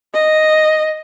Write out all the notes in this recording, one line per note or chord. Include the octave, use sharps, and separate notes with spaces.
D#5